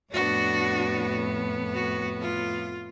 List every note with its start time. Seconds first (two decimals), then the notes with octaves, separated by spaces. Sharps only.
0.12 F2 A2 B3 D4 F#4
1.74 F#4
2.21 F4